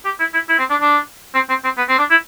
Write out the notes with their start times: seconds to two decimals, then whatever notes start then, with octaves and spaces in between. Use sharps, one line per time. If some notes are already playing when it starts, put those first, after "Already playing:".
0.05 G4
0.20 E4
0.34 E4
0.49 E4
0.59 C4
0.70 D4
0.81 D4
1.35 C4
1.50 C4
1.64 C4
1.78 B3
1.89 C4
1.99 D4
2.11 E4